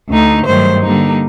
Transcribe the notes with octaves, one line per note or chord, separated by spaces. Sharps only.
D2 D3 A3 D#4
G2 D#3 F#3 A3 C5
D3 G3 A#3 D#4